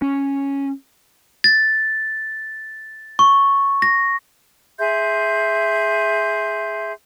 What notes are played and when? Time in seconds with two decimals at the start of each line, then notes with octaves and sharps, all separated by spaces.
0.02 C#4
1.44 A6
3.19 C#6
3.82 A#6
4.78 G#4 E5 C6 G6